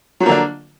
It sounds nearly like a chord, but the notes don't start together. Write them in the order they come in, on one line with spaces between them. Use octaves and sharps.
F#3 F3 A#3 D3 D4